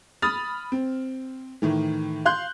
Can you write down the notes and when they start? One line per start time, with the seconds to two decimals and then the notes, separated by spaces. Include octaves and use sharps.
0.22 B5 D#6 F6 A6
0.72 C4
1.62 A2 D#3 E3
2.25 F5 C6 F#6 G6